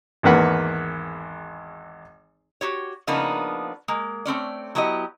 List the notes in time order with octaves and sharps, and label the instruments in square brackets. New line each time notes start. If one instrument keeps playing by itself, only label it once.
[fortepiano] G#1 E2 A#3 B4 F#5 B5
[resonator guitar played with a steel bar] F#4 G4 C#5
C#3 F3 A#3 B3 D4 D#4
G#3 A#3
A3 C4 C#4 D5
F#3 B3 E4 G4 D#5